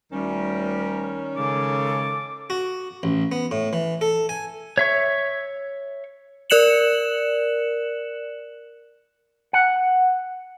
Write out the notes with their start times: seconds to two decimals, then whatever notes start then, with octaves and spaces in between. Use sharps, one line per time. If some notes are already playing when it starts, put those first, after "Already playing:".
0.12 D2 D#3 G3 C#4 A#4
1.37 C#3 G#3 A4 D6
2.50 F#4
3.03 A1
3.32 B3
3.51 A2
3.73 E3
4.01 A4
4.29 G#5
4.78 C#5 E5 C#6
6.50 A#4 D5 F#6 C#7 E7 F#7
9.53 F#5